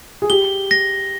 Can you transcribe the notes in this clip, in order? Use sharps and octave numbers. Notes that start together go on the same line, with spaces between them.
G#4
G4 G7
A#6